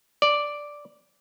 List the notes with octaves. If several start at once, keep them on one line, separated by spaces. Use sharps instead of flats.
D5